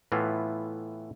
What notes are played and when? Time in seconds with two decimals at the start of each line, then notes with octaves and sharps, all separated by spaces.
0.12 A2 E3 B3 F4